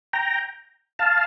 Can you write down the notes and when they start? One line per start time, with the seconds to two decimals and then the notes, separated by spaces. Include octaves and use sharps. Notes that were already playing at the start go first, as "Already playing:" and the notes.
0.13 G5 A#5
0.99 F5 A5